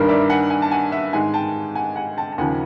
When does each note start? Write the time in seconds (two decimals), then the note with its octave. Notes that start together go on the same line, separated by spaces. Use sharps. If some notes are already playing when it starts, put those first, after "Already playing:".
Already playing: G2 D#3 G3 A#3 D4 A#4
0.08 D5 E5
0.30 F#5 G#5
0.50 F#5 G#5
0.62 A5
0.71 F#5 G#5
0.92 E5 F#5
1.13 G#2 D#3 G#3 F#5 G#5
1.34 G5 A5
1.75 F#5 G#5
1.96 F#5 G#5
2.17 G5 A5
2.32 A5
2.38 D#2 C#3 F3 F#5 G#5